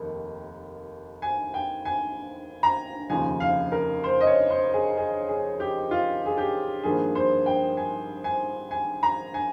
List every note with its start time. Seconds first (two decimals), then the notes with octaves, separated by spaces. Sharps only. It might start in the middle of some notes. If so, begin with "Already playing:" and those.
Already playing: F1 D#2 D#3 A#3
1.22 G#5
1.54 G5
1.85 G#5
2.63 A#5
3.09 F1 D#2 C#3 F3 G#5
3.40 F5
3.72 A#4
4.04 C5
4.21 D#5
4.27 C#5
4.50 C5
4.74 G#4
4.97 G#4
5.29 G#4
5.60 G4
5.91 F4
6.26 G#4
6.38 G4
6.83 G#1 G2 F3 A#3 G#4
7.15 C5
7.46 G5
7.77 G#5
8.24 G#5
8.71 G#5
9.03 A#5
9.34 G#5